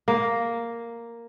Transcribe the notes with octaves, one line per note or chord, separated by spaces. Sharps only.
A#3